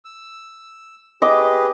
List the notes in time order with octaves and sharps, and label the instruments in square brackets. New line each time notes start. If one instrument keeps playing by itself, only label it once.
[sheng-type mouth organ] E6
[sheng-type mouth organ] G4 G#4 B4 [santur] D#5 D6